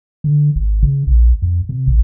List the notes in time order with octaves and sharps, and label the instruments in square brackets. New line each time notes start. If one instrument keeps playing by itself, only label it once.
[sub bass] D3
G#1
C#3
A#1
F2
C3
A1